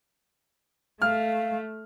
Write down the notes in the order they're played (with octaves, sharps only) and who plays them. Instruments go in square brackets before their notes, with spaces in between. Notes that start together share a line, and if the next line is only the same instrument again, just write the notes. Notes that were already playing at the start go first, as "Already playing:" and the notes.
[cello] A3 [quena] F5 [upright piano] F6